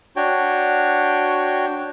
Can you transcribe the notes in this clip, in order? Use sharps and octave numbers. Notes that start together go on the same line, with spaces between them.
D4 F#4 C#5 G5